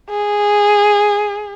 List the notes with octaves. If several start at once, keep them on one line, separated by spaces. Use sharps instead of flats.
G#4